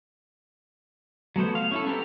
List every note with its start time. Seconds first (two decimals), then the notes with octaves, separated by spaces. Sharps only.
1.36 F#3 A3 B3 C5
1.55 F5
1.71 C#4 E4 A4
1.87 B3 C4 G4 A4 A#5